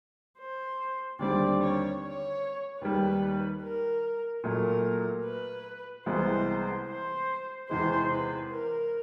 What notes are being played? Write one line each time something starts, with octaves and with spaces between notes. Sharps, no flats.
C5
D#2 D3 G3 C4 D5
C#5
C#5
D#2 D#3 G3 B4
A#4
A#2 F#3 A3 A#4
B4
C2 C3 E3 G#3 B3 C5
C5
E2 C3 E3 G#3 C5
B4
A#4